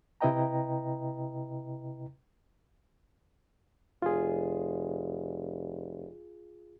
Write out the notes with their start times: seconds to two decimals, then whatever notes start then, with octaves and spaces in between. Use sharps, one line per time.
0.21 C3 E4 B4 D#5 G5 A#5
4.02 F1 F4 G#4